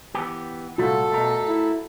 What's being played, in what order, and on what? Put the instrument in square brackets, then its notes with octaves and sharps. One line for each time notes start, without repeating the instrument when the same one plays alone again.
[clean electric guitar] E3 B3 G4
[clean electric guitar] C2 A#2 A3 [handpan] F4 F#4 [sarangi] A4
[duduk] B2 [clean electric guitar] A3 A#4
[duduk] E4